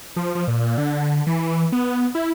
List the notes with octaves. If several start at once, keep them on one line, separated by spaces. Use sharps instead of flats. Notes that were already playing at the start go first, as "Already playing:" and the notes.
F3
F3
A#2
D3
E3
B3
E4